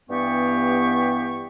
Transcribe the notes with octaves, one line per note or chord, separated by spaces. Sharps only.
G2 E3 B3 G4 C#6